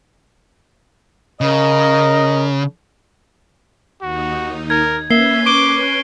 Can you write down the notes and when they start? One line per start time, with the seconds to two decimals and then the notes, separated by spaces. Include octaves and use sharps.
1.41 C#3 A#4 D#5
4.02 D#2 D#4 F#4
4.70 A#4 G#6
5.11 A#3 C#4 B4 E5 C7 G7
5.46 C#6 D6 D7 G7